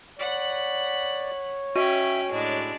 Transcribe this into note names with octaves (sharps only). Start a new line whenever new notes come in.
C#5 D5 F#5 B5
C#4 F#4 E5 G5 C#6 D#7
A2 G#3 D4